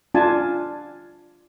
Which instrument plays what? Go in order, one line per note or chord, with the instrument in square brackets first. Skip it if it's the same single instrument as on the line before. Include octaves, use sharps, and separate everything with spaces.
[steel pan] D4 F4 G#5 A5